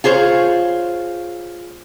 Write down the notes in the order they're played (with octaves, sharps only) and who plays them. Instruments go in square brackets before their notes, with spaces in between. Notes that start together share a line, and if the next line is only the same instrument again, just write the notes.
[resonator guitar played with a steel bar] F4 G#4 C5 C#5